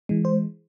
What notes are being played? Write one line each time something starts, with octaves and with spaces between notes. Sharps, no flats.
E3 G#3
C5